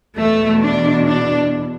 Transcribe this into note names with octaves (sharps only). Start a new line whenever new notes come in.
E2 B2 A3
D4
D4